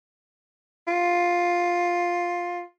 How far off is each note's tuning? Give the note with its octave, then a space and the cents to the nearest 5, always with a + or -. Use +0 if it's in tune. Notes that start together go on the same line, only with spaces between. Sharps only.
F4 +5